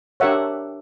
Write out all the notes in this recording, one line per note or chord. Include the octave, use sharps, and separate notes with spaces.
D4 G4 A#4 C#5 E5 F#5